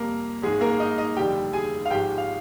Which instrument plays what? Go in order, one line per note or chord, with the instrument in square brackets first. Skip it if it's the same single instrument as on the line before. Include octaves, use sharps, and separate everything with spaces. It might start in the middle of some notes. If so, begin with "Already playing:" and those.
Already playing: [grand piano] F2 C3 G3 A#3 A#4
G#1 G#2 D#3 G#3 G#4
A#3 A#4
D#4 D#5
D#4 D#5
F1 D#2 D3 G3 G4 G5
G#4 G#5
F5
G#1 G#2 F3 G#3 G4 G5
F5